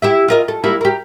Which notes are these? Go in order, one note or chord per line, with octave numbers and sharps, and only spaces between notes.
E4 G4 E5
F4 A#4 D#5
A4
G3 A#3 E4
G4 A#4